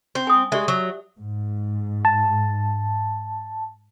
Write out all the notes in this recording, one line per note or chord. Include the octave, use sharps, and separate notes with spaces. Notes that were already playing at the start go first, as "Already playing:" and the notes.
C4
G#5 D#6
G#3 G4 D5 E5
F#3
G#2
A5